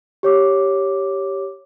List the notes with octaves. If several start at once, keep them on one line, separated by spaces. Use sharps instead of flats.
G4 C#5 D6